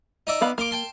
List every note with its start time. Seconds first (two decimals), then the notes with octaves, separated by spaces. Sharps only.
0.27 D#4 D5 E5
0.41 B3 F5 B5
0.58 A#3 F5 C6 D6
0.71 G5 A5 C6